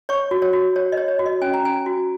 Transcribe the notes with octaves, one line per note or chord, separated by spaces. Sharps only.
C#5 C#6
F#4
C#5
F#4
C#5
D#5
C#5
C#5
F#4
D#5
C#4 G#5
A#5
C#4 G#5
F#4